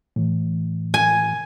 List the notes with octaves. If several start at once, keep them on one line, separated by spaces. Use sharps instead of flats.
A2 E3
G#5